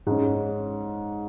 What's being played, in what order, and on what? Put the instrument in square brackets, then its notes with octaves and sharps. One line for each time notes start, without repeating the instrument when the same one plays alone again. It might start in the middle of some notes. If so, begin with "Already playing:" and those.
[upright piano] G#2 G#3 C#4